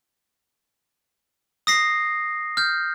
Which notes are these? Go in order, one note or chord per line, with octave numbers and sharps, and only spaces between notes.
D#6 A#6 C7
F6 G6